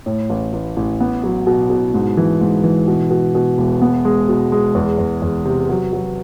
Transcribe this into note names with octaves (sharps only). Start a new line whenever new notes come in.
A2
A1
A1
A1
B3
F#3
B2
B2
G#2
E3
G#2
E3
B2
B2
B2
E1
B3
G#3
B2
G#3
E2
E2
E2
C3
F#3
F#3